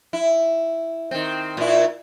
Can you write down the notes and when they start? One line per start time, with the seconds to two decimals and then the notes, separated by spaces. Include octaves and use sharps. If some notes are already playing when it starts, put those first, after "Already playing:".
0.13 E4
1.11 D#3 C4
1.57 A#2 E4